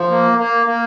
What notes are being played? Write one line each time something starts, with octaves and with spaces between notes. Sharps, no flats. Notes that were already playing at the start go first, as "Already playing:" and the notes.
Already playing: F3
A#3
A#3
A#3